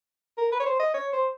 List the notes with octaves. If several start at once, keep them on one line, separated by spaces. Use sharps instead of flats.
A#4
B4
C#5
C5
D#5
C#5
C5